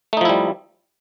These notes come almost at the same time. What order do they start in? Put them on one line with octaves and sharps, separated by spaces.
A3 D#4 F3 E4 G3